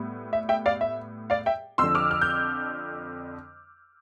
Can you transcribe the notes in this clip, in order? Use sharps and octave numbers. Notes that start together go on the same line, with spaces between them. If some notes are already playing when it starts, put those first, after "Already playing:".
Already playing: A2 G3 B3
E5
E5 G5
D5 F5
E5
D5 F5
E5 G5
F2 D3 F3 C6 E6
D6 F6
F6
G6